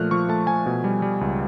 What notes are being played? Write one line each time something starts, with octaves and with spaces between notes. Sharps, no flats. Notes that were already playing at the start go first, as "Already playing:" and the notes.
Already playing: A#2 F3 A3 F6 F#6
F3 C#6
A3 A5
F3 G#5
B2
G3
G3
C#2